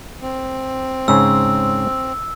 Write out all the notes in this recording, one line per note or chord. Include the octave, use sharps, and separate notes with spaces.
C4
G#2 C#3 E6